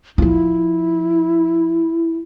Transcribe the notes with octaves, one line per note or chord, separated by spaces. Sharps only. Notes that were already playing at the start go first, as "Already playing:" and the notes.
F3 E4 F4